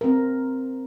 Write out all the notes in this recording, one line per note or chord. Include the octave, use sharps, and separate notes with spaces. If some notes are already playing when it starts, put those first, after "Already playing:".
C4 A#4